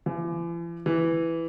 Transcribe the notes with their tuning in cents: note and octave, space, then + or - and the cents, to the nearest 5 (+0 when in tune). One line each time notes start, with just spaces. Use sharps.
E3 +45
E3 +5